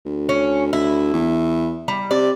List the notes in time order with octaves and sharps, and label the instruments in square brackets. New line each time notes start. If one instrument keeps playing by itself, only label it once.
[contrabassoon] D2
[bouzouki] C#4
[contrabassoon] D2 [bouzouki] E4
[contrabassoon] E2
[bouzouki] G3
[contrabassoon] C3 [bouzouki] D5